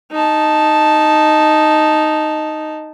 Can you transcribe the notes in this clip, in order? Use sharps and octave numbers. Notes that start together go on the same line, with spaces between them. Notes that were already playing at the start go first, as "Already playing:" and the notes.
D#4 A5